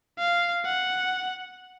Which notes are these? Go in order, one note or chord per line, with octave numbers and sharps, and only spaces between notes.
F5
F#5